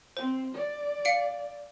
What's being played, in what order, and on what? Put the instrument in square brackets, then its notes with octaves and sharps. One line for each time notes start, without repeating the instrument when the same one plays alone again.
[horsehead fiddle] C4 [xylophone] C5
[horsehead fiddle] D5
[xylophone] F5 C#7 D7